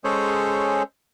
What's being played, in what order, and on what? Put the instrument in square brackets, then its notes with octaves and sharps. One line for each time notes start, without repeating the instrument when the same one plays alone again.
[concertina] G#3 C#4 G#4 A4 C5 C#5